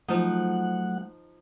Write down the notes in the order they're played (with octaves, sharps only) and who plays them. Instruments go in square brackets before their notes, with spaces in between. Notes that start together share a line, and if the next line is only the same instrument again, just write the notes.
[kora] F3 D#4 [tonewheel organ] F#3 A3 F#5